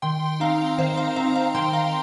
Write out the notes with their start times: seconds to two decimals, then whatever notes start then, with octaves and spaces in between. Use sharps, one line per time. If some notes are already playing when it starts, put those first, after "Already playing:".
0.02 D#3 G5 C6
0.40 C4 D#4 F5 A#5
0.78 D#3 C5 F5
0.97 F5 A#5
1.16 C4 D#4 F5 A#5
1.36 F5 A#5
1.55 D#3 G5 C6
1.73 F5 A#5